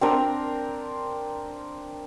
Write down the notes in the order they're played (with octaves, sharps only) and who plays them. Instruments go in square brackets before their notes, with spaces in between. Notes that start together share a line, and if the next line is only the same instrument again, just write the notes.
[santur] C4 D4 A#4